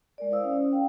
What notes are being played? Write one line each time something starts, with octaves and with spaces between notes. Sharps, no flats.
G#3 A#4 D5
E4 C5 F5 D#6 E6
C#4
F5 G5